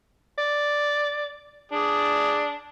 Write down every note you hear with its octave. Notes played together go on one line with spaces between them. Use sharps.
D5
D4 G#4 D5